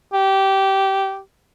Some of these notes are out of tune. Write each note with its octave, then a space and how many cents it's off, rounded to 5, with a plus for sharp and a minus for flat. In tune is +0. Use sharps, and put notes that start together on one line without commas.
G4 -15